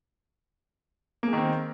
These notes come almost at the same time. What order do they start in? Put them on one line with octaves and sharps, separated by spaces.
A#3 G#3 D#3 C4